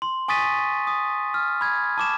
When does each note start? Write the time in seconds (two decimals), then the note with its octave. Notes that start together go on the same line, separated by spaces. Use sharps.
0.02 C6
0.28 G#5 C#6 D#6 A6 B6 D#7
0.87 D#6
1.34 F6
1.61 B5 G#6
1.98 A5 D6 E7